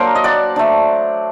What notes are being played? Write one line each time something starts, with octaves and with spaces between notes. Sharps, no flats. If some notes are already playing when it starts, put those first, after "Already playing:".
Already playing: F#3 A#3 D4 F#4 A#4 C5
D#5
D5 F#5
A3 D4